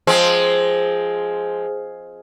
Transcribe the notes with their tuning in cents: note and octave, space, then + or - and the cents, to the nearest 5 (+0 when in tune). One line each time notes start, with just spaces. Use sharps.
F3 +0 G#3 +5 C4 +0